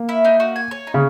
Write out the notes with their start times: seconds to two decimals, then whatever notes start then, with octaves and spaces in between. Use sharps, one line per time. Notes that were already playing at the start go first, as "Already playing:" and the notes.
Already playing: A#3
0.09 E4
0.25 D#4
0.40 F#4
0.56 G#5
0.71 C#5
0.87 D#4
0.94 C#3